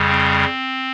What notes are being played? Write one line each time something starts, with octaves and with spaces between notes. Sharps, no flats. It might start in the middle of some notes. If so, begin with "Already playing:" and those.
Already playing: F2 C#3 G3
C4